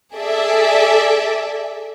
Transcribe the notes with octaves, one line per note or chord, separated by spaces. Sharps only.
G#4 A4 D5 E5